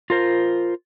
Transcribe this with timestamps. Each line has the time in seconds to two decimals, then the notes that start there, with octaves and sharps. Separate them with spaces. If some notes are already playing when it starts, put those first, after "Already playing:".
0.10 F4 A#4 C5